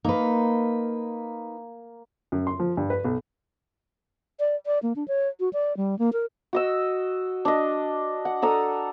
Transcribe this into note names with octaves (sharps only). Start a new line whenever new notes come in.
A#3 D#4 B4
F#2
C6
F3
G2
B4
B1
D5
D5
A#3
D4
C#5
F#4
D5
G3
A#3
A#4
F#4 D#5 E6
D4 D#5
F#5
D4 A4 A#5 D#6